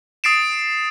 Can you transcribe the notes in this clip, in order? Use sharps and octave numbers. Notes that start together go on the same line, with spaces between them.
D#6 A6 C7 D7 E7